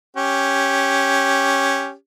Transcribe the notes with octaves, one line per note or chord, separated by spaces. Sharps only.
C#4 G4